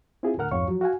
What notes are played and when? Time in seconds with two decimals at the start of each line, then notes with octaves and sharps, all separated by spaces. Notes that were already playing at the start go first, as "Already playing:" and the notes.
0.23 C4 E4 F4 G4 G#4
0.37 D2 A2 D3 A#4 F#5 F6
0.51 C2 F2 G#2 C#5 F5 C#6
0.68 F3 F#3 F#4
0.81 F#4 F5 F#5 G#5